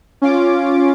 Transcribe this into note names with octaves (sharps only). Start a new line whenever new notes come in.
C#4 F4 D6